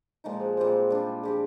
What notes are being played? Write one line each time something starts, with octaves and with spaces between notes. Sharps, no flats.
A#2 F3 G#3 D#4
G#4 C5
A#2 G3 C4 G4 G#4 C5
G3 D4 F4
F3 C4 G4 G#4 D5